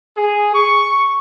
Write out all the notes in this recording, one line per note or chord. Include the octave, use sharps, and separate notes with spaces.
G#4
C#6